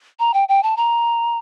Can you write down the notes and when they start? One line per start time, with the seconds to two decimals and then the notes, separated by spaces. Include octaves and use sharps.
0.20 A#5
0.34 G5
0.49 G5
0.63 A5
0.77 A#5